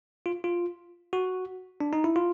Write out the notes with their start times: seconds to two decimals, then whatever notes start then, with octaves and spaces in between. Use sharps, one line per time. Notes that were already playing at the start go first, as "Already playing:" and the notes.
0.26 F4
0.44 F4
1.13 F#4
1.81 D4
1.93 D#4
2.04 E4
2.16 F4